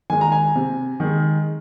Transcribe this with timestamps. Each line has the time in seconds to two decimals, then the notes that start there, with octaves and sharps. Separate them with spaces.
0.10 D#3 G#3 G#5
0.21 A#5
0.32 G#5
0.55 C3
1.00 D#3 G#3